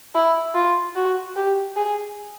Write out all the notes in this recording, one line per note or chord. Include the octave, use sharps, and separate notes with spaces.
E4
F4
F#4
G4
G#4